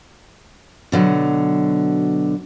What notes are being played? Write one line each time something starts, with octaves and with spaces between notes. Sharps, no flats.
B2 D3 F#3